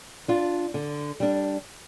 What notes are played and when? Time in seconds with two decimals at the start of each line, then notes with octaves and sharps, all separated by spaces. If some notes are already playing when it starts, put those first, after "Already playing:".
0.28 D4 F4
0.74 D3
1.20 G3 D4